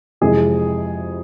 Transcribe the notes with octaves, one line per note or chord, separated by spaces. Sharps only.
F2 C3 E3 G#3 G#4